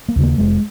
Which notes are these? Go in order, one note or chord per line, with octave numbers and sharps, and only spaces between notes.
A#3
D#2 C#3
A#3
F1 G#3